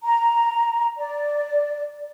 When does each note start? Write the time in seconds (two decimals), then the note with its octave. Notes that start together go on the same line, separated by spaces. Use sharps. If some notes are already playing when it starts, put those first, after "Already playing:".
0.03 A#5
0.98 D5